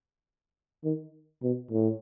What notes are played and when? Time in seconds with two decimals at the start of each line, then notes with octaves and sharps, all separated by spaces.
0.84 D#3
1.43 B2
1.71 A2